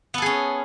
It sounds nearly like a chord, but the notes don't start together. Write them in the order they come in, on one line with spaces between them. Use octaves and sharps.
B3 A4 G#4 C#4